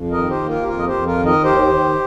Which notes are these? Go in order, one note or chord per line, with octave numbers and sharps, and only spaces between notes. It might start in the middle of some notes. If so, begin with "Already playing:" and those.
Already playing: F2
A#4 D#5
D#3
G4 C5
A#3
F4 A#4
G4
F2 F4 A#4
D#5
G4 C5
F2
F4 A#4
D#3
A#4 D#5
D#2 G4 C5
D#3